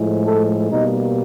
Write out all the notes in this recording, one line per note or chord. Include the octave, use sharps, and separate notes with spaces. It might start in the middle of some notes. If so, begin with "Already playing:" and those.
Already playing: A2 F3 G#3
A4
B2 G3 A#3 D#4